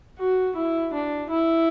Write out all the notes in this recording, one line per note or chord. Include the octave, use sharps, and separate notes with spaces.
F#4
E4
D4
E4